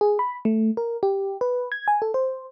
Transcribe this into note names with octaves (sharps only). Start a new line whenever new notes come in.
G#4
B5
A3
A#4
G4
B4
G#6
G#5
A4
C5